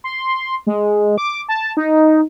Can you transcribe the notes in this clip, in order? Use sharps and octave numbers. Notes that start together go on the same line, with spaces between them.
C6
G#3
D6
A5
D#4